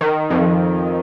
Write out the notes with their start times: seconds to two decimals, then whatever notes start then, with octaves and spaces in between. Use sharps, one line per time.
0.01 D#3
0.30 F2